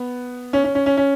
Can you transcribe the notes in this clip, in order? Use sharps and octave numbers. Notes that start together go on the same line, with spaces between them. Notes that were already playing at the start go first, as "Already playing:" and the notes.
Already playing: B3
C#4
C#4
C#4
C#4
C#4